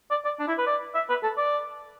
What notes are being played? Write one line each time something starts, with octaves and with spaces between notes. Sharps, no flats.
D5
D5
D4
E4
B4
D5
E5
B4
A4
D5